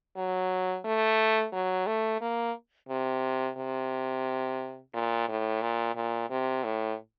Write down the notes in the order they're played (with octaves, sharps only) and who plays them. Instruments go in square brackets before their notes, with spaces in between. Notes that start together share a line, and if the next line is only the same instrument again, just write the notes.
[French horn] F#3
A3
F#3
A3
A#3
C3
C3
A#2
A2
A#2
A#2
C3
A2